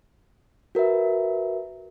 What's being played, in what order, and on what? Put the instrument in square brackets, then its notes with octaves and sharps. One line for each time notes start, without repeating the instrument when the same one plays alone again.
[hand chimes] F#4 A#4 B4 E5